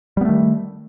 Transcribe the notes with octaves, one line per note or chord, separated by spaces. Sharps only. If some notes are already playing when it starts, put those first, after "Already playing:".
D#3 G3 A3 B3